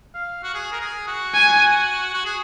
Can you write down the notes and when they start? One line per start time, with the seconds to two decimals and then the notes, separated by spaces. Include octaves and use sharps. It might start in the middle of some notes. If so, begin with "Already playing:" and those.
0.15 F5
0.43 F#4
0.55 G#4
0.72 A#4
0.81 G#4
1.07 F#4
1.34 G#5
2.14 F#4
2.25 G#4